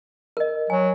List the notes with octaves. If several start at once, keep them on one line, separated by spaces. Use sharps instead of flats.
A#4 D#5
F#3 G#5